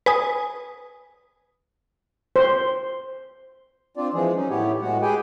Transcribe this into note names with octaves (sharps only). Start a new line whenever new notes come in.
B4 G#5 D#6
C5
C4 D4 F4 D5
E3 F3 G#3 G#4
F#3 C#4 D#4
A2 B3 E4 G4 C#5
A2 G#3 B3 F#4 F#5
G4 G#4 B4 G5 G#5